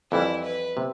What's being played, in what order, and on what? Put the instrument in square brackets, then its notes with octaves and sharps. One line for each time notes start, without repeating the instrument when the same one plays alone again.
[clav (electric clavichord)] F2 E3 G3 [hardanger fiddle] E4
[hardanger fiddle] B4
[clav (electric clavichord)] C3